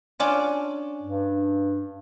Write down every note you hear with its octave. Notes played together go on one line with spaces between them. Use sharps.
C#4 D4 F4
G2